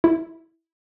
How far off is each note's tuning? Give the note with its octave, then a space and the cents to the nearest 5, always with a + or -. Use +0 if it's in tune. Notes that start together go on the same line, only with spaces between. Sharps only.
E4 -10